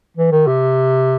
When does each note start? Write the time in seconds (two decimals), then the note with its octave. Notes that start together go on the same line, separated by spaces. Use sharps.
0.17 E3
0.32 D#3
0.47 C3